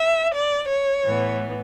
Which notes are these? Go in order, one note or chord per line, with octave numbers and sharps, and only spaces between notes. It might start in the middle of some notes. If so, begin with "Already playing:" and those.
Already playing: E5
D5
C#5
A2 E3 B3